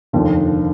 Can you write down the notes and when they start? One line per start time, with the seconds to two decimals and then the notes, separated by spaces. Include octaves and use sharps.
0.13 F1 D#2 D3 F3